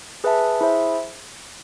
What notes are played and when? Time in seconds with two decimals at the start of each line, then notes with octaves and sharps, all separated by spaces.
0.24 G#4 B4 E5 A5
0.61 E4 G#4 C5 E5